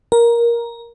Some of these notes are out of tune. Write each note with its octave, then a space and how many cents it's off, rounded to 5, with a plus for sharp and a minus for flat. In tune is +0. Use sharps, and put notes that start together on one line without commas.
A#4 +10